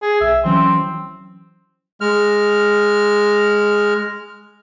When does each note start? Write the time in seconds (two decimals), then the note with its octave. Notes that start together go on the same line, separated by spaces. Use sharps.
0.03 G#4
0.21 B1 E5
0.45 E3 F#3 C4 C#4
2.01 G#3 F6